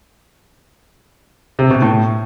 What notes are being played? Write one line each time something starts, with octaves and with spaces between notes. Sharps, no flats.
C3
B2
A2